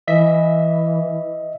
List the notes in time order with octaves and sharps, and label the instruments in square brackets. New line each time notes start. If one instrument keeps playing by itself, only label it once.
[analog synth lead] E3 [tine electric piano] D#5 E5 B6